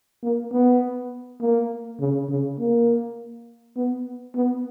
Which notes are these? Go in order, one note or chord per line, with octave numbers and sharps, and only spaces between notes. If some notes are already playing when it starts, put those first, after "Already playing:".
A#3
B3
A#3
C#3
C#3
A#3
B3
B3